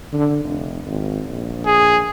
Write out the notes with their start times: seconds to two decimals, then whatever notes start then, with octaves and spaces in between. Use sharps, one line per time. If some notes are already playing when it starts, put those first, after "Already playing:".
0.13 D3
0.44 F1
0.86 G#1
1.29 A#1
1.66 G#4